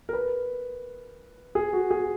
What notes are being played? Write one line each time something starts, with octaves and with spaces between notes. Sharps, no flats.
A#4
B4
G#4
F#4
G#4